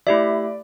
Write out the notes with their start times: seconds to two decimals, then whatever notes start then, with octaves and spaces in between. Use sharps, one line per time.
0.07 A3 E4 G4 D5 E5